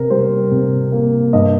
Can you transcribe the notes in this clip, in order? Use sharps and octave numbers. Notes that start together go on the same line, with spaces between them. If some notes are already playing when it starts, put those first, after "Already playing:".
Already playing: C3 A#4
G3 C5
C3
A#3
G2 D#5